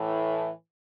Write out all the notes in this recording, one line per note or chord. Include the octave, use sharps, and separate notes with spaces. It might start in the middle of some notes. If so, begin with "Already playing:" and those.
Already playing: A2 E3